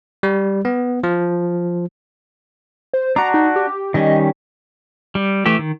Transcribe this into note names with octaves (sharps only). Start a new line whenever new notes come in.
G3
B3
F3
C5
D4 F#4 A#5
D#4
G4
D#3 G3 C#4 D#5
G3
E3 A3 G4
D#3